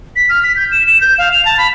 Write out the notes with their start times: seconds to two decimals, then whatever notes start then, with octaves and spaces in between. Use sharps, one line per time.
0.16 B6
0.29 F6
0.43 B6
0.56 G6
0.72 E7
0.87 E7
1.01 G6
1.18 F5
1.32 F7
1.45 A5
1.58 B5